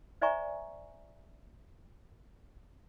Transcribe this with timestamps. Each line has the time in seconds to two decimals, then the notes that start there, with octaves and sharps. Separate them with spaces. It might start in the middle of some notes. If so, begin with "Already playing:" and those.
0.21 C5 D5 E5 G#5 A#5 C#6